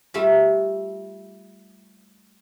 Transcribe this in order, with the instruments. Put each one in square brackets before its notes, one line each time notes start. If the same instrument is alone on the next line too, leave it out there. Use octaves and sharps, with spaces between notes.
[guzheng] G3 A3 F4 A4